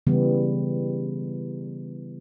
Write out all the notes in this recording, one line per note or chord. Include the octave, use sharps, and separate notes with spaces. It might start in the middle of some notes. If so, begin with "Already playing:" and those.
C#3 E3 G3 B3